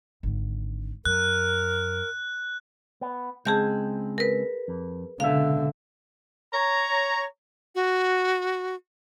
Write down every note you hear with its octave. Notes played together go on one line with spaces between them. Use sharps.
G#1 D3
F#2 A#4 F#6
B3
C#2 G#3 C4 G#4 A5 G6
A#4 B4
F2
C#2 B2 D3 E5 F5
C#5 A#5
F#4